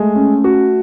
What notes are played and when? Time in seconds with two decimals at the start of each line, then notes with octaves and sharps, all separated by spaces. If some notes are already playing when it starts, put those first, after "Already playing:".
Already playing: G#3 A3
0.15 C#4
0.44 F#4